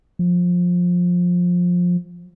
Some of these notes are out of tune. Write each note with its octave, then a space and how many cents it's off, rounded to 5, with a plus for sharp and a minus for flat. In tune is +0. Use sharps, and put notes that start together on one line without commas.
F3 +20